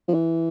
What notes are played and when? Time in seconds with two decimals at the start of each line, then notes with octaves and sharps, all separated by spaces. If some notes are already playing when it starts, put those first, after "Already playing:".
0.08 F3
0.14 E3